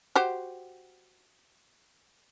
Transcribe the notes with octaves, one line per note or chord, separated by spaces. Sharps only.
F#4 G4 C5